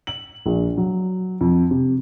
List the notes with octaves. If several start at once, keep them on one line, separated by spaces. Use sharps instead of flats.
F#7
A#1
F#3
F2
C3